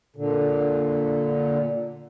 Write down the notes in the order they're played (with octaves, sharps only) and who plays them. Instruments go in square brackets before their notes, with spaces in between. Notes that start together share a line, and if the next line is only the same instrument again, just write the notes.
[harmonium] A#2 D3